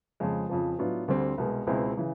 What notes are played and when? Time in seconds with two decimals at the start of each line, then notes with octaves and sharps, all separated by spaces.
0.20 F2 C#3 F3 G#3
0.49 F2 C#3 F3
0.79 A2 F#3 B3 D4 F4
1.08 D2 D3 G3 C4
1.38 C2 B2 G#3
1.67 C#2 B2 G#3 C4 E4
1.97 C#3 E3